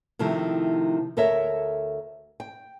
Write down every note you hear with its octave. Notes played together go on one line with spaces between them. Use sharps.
C3 D#3 F3 A3 E4
D2 A4 A#4 C#5 E5
G5